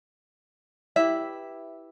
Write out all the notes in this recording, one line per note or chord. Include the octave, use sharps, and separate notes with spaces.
E4 G4 B4 E5